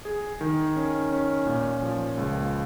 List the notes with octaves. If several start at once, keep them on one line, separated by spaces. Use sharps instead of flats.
G#4
D#3
C#4
C#4
A#2
F3
C#2